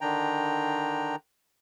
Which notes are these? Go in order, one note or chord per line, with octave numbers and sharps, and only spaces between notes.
D3 D#3 D4 G5 A#5